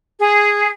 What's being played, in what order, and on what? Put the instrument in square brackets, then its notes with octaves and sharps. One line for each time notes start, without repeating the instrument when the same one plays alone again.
[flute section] G#4